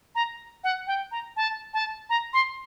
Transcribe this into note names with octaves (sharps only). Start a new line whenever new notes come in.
A#5
F#5
G5
A#5
A5
A5
A#5
C6